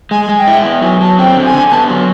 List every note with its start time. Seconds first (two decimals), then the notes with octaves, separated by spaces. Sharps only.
0.11 G#3 G#5
0.29 G#3
0.39 G5
0.47 E4
0.65 B3
0.82 F#3 G#5
1.01 F#3 A5
1.18 C4 G5
1.36 D3
1.45 G#5
1.53 D3
1.71 B3 A5
1.90 F#3